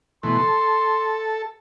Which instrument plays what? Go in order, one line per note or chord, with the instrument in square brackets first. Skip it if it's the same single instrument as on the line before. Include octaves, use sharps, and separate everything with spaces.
[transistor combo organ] B2 E3 A3 [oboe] C6
[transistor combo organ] A4